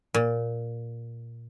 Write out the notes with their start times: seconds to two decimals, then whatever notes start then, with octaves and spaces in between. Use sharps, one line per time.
0.14 A#2